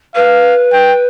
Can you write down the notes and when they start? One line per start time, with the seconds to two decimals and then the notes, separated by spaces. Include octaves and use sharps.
0.15 B4 F5
0.73 G5